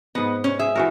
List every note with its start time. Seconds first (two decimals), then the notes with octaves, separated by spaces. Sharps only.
0.15 G#2 B3 D#5
0.44 C#4
0.59 G#4 E5
0.75 E3 F#4 A#4